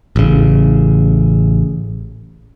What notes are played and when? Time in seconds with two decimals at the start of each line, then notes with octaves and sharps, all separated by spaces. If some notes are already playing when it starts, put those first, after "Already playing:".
0.16 A1 C#3